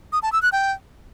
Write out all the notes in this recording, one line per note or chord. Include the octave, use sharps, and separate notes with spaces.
D#6
A5
E6
F#6
G5